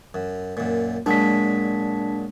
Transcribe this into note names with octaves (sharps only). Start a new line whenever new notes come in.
F#2
F#2 A#2
A#2 F#3 G#3 D4 B6